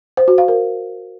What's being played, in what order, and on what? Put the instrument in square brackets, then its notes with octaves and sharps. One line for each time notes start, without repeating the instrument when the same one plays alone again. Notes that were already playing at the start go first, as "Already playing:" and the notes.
[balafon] C5
F#4
F5
A#4